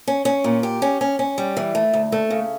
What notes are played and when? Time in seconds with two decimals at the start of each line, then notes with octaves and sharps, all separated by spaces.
0.07 C#4
0.25 C#4
0.44 A#2
0.63 G4
0.82 C#4
1.01 C#4
1.19 C#4
1.38 G3
1.57 E3
1.75 A3
1.93 D2
2.12 A3
2.30 C#3